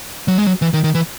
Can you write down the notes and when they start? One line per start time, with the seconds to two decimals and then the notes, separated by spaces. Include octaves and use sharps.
0.28 F#3
0.38 G#3
0.47 F#3
0.62 E3
0.73 D#3
0.84 D#3
0.95 E3